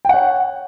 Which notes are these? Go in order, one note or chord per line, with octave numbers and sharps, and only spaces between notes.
C#5 F#5 G5